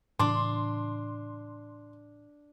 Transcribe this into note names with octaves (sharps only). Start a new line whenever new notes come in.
A2 C#3 E3 D4 C6